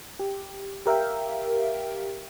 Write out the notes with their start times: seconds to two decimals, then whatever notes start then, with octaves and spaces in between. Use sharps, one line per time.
0.20 G4
0.86 G4 A#4 E5 F5 G5